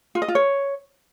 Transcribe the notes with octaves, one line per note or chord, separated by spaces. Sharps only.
F4
D#5
F4
C#5